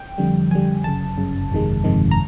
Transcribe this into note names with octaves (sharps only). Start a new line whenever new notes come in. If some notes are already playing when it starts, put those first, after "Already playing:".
Already playing: G5
F2 D3 G3
F2 D3 G3 G#5
G1 F#2 C#3 A5
G1 F#2 C#3
G1 F2 C3 D#3 G#3
G1 F2 C3 D#3 G#3
A#5